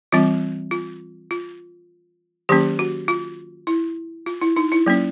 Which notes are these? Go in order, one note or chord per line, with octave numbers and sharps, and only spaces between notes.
E3 G3 C4 F4
F4
F4
D#3 F#3 A#3 C#4 G4
F#4
F4
E4
F4
E4
D#4
E4
F#3 A#3 C#4